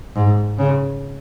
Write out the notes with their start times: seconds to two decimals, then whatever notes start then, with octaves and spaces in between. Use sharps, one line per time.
0.16 G#2
0.58 C#3